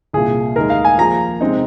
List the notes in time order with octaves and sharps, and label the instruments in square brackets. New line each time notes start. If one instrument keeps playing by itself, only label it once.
[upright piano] C2 A#2 A#3 [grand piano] G#4
[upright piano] D#2 D#3 G#3 D#4 [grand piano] A#4
[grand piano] F5
G#5
[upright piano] F3 A#3 G#4 [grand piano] A#5
[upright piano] C3 G#3 C4 D#4